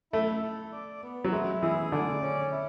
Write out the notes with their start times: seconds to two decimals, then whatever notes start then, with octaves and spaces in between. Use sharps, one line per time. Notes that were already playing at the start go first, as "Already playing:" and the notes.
0.13 A3 E4
0.42 A4
0.72 D5
1.03 B3
1.24 F#3
1.32 G#3 E4
1.62 E3 G#4
1.91 D3 D5
2.22 C#4
2.52 E4